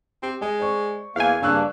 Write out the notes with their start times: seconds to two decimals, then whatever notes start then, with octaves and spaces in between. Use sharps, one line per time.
0.23 C4 G4
0.41 G#3 D#5
0.59 C5 D5 C#6
1.16 E2 A#3 F5 G#5
1.42 G2 C#3 A#3 D4 C#6 E6 F#6